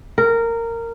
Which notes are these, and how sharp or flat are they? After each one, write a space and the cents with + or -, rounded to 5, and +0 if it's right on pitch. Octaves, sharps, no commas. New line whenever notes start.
A#4 -15